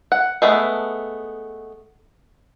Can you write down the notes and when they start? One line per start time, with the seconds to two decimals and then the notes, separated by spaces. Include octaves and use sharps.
0.12 F#5
0.42 G#3 A3 B3